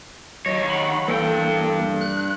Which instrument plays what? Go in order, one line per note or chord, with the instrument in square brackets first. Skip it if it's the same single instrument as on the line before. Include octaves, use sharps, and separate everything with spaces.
[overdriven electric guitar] D#3 C#5 [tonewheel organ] F#3 D#5
[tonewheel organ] F#5 B5
[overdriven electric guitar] G2 G5 [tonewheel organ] E3 A#3 A4
[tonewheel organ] F#6